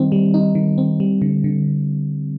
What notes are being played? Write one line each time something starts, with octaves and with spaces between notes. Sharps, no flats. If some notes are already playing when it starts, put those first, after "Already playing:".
Already playing: D#3 G3 C4 D#4
G3
D#4
D#3
C4
G3
D3
D3